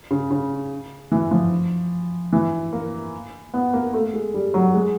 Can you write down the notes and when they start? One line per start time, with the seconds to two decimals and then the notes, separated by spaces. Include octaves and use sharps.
0.11 C#3
0.31 C#3
1.12 E3
1.31 F3
2.33 E3
2.73 A#3
3.54 B3
3.73 A#3
3.94 A3
4.14 G#3
4.34 G3
4.54 F#3
4.74 G#3